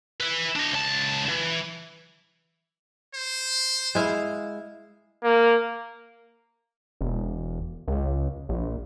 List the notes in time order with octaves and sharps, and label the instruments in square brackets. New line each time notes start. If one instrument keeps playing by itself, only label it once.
[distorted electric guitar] B4 E5
D4 D#5
C#2 A5
E3
[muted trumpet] C5
[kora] G#3 E4 F5
[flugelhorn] A#3
[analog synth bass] E1
C#2
A#1